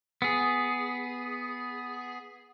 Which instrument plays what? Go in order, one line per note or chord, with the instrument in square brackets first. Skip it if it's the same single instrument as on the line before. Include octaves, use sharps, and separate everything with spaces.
[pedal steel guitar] B3 G#4